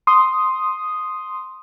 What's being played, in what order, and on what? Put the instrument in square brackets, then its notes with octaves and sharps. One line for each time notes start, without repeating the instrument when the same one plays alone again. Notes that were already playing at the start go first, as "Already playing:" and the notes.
[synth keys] C6 D#6